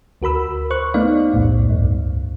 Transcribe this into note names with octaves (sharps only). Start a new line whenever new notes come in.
D2 F#4 A#4 B5 E6
C5 C#6 F#6
A3 B3 D#4 D5 F5
B1 E2 A2
C#2 G2